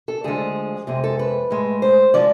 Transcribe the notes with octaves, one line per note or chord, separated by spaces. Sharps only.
A4
D2 D3 F3 G#3 G#4
F2 C3 G#3 G#4
A4
B4
A2 G#3
C5
F3 G#3 D5